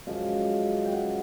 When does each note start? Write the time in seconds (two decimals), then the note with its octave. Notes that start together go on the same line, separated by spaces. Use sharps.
0.07 F#2 C#3 F3 G#3 F5
0.85 G5
0.92 F#5